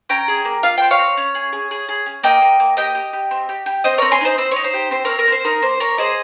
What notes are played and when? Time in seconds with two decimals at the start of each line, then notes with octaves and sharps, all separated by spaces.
0.09 C#4 G5 A#5
0.28 G#4
0.45 A#3
0.63 F4 F5
0.78 C4 G5
0.91 C#5 F5
0.99 C4
1.17 C#4
1.35 G#4
1.53 G#4
1.71 G#4
1.89 G#4
2.06 C#4
2.23 A#3 D#5 G5
2.42 A#3
2.60 A#3
2.77 G4 D#5 G5
2.95 G4
3.13 G4
3.31 C4
3.49 G4
3.66 G4
3.84 C4 C5 D#5
3.98 C4 A#4 C#5
4.12 G#5 C6
4.21 D#4 C5 D#5
4.38 C4 C5
4.51 D#4 C#5
4.64 C5
4.74 G4
4.91 C4 C5
5.05 C4 A#4 C#5
5.19 A#4
5.28 C4 C5
5.45 D#4 A#4
5.62 A#3 C5
5.80 A#3 A#4 C#5
5.98 G#4 C5 D#5